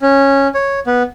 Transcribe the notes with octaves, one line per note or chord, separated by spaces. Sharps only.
C#4
C#5
B3